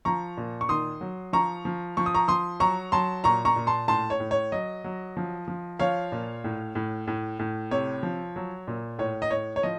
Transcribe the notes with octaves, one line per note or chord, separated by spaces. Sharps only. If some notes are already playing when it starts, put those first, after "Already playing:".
F3 A#5 C#6
A#2
C#6
D#3 C6 D#6
F#3
F3 A#5 C#6
F3
F3 C#6
D#6
A#5 C#6
F3 C6 D#6
F#3 A#5 C#6
F#3 A5 C6
A#2 A#5 C#6
A#5 C#6
A#2
A5 C6
A2 A5 C6
C#5
A2
C#5
F#3 D#5
F#3
F3
F3
F3 C#5 F5
A#2
A2
A2
A2
A2
C3 C#5
F3
F#3
A#2
A2 C#5
D#5
A2 C#5
C#5
F3 D#5